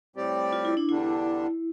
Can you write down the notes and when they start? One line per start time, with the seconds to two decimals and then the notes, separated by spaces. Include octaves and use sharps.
0.16 A2 G3 C4 G4 D5
0.53 F4
0.65 E4
0.77 D4
0.88 E2 D3 G3 D4 E4